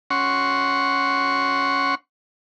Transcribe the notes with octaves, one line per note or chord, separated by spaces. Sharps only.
C#4 F#5 C6 C#6